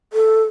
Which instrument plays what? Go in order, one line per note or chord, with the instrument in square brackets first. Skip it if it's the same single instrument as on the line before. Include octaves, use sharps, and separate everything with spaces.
[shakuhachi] A4